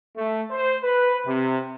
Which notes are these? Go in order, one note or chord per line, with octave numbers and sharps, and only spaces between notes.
A3
C5
B4
C3